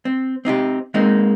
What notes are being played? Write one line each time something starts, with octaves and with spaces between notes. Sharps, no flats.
C4
C4 D#4 F4 G4
G#3 A#3 C4 D#4